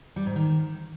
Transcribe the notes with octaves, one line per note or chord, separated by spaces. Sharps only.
G3
G#2
D#3